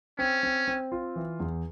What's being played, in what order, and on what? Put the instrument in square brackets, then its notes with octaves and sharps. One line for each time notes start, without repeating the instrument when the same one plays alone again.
[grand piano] C4 [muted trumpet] C#4
[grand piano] C4
C4
F4
E3
E2